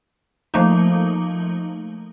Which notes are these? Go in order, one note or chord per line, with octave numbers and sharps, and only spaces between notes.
F3 A3 A#3 D#4